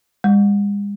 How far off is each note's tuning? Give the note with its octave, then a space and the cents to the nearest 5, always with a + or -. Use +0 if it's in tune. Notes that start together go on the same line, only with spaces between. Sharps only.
G#3 -45